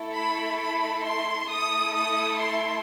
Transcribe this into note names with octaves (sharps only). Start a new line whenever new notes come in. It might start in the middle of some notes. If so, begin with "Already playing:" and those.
Already playing: A3 E4 A4
B5
B5
C6
A3 E4 A4 D#6
D#6
C6